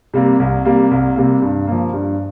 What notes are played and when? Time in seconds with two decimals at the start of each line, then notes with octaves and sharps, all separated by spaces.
0.14 C3 G3 A#3
0.39 C2
0.65 C3 G3 A#3
0.91 C2
1.16 C3 G3 A#3
1.42 G2
1.67 F3 A#3
1.93 G2